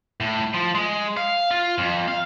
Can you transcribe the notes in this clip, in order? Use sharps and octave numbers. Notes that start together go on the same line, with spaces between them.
A2
F3
G#3
F5
F4
F2
F5